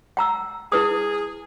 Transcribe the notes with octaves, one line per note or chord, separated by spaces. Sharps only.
F#5 A#5 E6
E4 G#4 B4 D#6